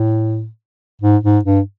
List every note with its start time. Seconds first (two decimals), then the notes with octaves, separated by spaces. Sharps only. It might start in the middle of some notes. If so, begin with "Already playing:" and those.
Already playing: A2
1.01 G#2
1.23 G#2
1.45 G2